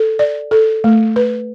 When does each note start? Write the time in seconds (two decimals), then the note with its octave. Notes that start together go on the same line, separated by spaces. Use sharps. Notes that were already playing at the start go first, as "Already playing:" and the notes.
Already playing: A4
0.19 D5
0.51 A4
0.84 A3
1.16 B4